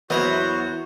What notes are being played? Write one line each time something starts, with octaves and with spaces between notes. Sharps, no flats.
E2 F#3 B3 E4 F#4 A#4 C5 D#5